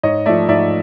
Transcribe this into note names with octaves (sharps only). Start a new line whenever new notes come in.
G#2 C#5 D#5
F3 A3 D5 E5
G#2 D5 E5